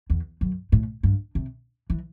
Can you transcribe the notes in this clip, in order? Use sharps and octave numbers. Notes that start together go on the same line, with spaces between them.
E2
F#2
A2
G2
C3
E3